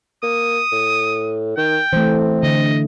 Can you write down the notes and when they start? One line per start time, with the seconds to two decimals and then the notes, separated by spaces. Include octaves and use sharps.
0.23 A#3 D#6
0.72 A2
1.57 D#3 G5
1.93 E3 A3 C4
2.43 D3 D#5